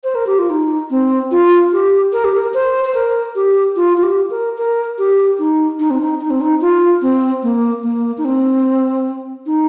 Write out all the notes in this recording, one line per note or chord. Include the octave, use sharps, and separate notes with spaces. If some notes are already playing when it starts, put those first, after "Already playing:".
C5
A#4
G4
F4
D#4
C4
F4
G4
A#4
G4
A#4
C5
C5
A#4
G4
F4
F4
G4
A#4
A#4
G4
D#4
D#4
C4
D#4
D#4
C4
D#4
F4
C4
A#3
A#3
D#4
C4
D#4